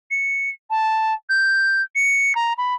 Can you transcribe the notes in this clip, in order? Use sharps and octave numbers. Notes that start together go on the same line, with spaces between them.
C#7
A5
G6
C#7
A#5
B5